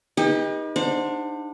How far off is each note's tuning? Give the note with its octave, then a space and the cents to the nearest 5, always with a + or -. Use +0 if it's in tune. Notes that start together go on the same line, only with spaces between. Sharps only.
D#4 +10 G4 +40 B4 -35
D4 +25 C5 +0 F#5 -30